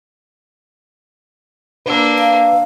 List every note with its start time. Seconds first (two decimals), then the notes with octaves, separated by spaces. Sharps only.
1.86 A#3 D4 B4 E6
2.19 F5